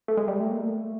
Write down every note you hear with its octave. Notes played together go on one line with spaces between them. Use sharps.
A3
G#3
G3
A3
A#3
A3